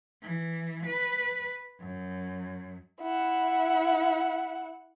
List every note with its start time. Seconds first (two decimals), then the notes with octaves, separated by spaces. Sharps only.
0.22 E3
0.86 B4
1.80 F#2
3.02 E4 F#5